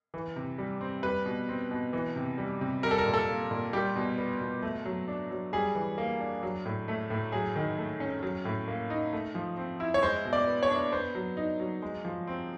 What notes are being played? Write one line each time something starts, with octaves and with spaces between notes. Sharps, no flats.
E3
C3
G3
C4
G3 B4
B2
C4
B2
E3
C3
G3
C3
G3 A#4
A4
A#4
A#2
A4
A#3
A#2
G3 G4
B2
B3
B2
A3
F#3
D4
F#3
G3 G#4
E3
A#3
D4
F#3
A2
A3
A2
F#3 G#4
D#3
A3
C#4
F#3
A2
A#3
D#4
A3
F3
C4
E4
C#5
G#3 C5
B2
D5
B3
C#5
D4
B3 C5
F#3
D#4
F#3
G#3
F3
C4